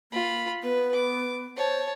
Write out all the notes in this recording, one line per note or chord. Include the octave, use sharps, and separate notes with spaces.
A#3 F4 B5
B3 B4
D6
C5 C#5 A5